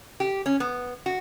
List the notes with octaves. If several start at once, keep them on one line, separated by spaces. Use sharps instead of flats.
G4
C#4
B3
F#4